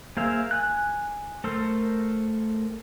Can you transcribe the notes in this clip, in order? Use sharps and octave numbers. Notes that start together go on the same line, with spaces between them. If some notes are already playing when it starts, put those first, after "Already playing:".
A#3 G#4 C5 E5 F5
G#5 F#6
A3 A4 A#4 C5